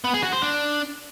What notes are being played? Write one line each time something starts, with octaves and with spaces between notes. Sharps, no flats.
B3
G#4
F#4
C5
D4